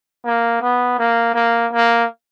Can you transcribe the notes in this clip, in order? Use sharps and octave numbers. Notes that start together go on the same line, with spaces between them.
A#3
B3
A#3
A#3
A#3